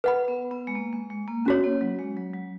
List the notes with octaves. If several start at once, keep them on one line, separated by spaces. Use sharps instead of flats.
B4 F#5 B5
B3
B3
G#3
A#3
G#3
G#3
A#3
B3 C#4 F#4 C#5
A#3
F#3
G#3
F#3
F#3